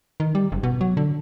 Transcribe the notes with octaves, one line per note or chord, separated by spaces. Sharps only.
D#3
G3
F#1
B2
F#3
D3